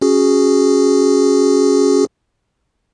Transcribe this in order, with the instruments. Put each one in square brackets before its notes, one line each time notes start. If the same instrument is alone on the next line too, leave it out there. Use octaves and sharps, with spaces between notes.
[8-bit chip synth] C#4 F#4 G#4